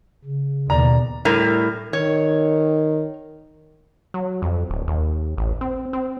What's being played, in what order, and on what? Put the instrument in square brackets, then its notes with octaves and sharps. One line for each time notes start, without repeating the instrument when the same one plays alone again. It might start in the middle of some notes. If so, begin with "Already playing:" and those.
[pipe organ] C#3
[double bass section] D#2 B2 [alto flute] D5 [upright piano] A#5
[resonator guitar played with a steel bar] A2 G3 A#4
[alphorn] D#3 [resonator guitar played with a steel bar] C#5
[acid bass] F#3
F2
D1
D#2
A1
C4
C4